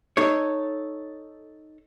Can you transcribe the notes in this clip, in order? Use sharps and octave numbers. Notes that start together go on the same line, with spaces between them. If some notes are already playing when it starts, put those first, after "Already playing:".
D#4 A4 C#5